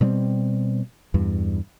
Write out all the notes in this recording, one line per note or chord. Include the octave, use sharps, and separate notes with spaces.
B2 G3 A#3 C4
E2 G2